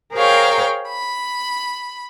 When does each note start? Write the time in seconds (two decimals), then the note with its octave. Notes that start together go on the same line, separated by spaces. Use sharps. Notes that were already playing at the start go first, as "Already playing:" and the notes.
0.14 G#4 A#4 C5 C#5 F5 G5
0.87 B5